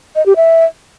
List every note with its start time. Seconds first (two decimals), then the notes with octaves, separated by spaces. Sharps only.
0.16 D#5
0.26 G4
0.36 E5